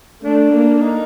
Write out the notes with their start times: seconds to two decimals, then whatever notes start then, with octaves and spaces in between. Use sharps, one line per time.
0.24 A3 D4
0.53 A#3
0.81 D#4